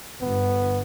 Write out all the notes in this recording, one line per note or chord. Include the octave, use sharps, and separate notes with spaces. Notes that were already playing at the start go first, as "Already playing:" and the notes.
G1 B3